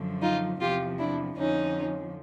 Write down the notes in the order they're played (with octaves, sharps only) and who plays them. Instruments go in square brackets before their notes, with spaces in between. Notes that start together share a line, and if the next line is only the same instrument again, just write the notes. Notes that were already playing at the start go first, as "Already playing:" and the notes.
Already playing: [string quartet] F#2 D3 F3
D#4 F4
E2 C3 F3 F4 G4
D4 E4
F2 D3 F3 C#4 D#4